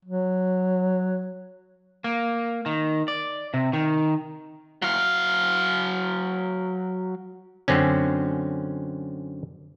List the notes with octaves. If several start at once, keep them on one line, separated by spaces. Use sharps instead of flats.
F#3
A#3
D#3
D5
C3
D#3
F#3 F5
F#2 D3 C4 C#4